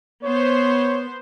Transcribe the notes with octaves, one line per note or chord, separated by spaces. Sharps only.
B3 C5 C#5